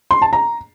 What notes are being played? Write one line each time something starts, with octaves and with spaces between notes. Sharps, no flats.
C6
A5
A#5